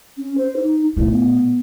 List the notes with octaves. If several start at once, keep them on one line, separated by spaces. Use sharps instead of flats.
C#4
C5
D#4
A#2 A3 E4
B3